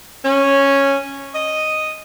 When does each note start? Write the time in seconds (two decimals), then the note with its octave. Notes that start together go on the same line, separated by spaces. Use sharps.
0.24 C#4
1.34 D#5